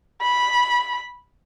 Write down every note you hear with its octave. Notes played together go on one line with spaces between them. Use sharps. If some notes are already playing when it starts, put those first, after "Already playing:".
B5